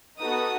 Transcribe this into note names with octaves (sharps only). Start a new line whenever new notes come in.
B3 D#4 F#4 A4 D#6